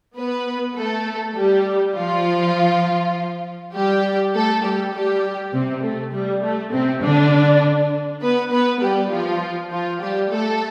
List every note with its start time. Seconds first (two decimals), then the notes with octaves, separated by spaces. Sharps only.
0.16 B3 B4
0.76 A3 A4
1.36 G3 G4
1.95 F3 F4
3.74 G3 G4
4.34 A3 A4
4.64 G3 G4
4.93 G3 G4
5.53 C3 C4
5.83 A3
6.13 G3
6.43 A3
6.72 C3 C4
7.02 D3 D4
8.22 B3 B4
8.51 B3 B4
8.81 G3 G4
9.11 F3 F4
9.72 F3 F4
10.00 G3 G4
10.31 A3 A4